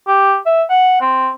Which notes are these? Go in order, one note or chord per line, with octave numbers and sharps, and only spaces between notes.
G4
E5
F#5
C4